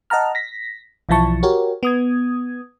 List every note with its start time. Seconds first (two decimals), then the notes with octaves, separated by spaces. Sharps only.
0.10 D#5 F#5 A5 A#5 F6
0.35 A#6 B6
1.09 B1 E3 F3 E4 A5 C#6
1.43 F#4 G4 A#4 C#5
1.83 B3 D#6 G#6